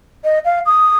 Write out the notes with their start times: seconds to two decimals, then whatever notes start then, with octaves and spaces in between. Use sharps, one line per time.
0.24 D#5
0.45 F5
0.66 D#6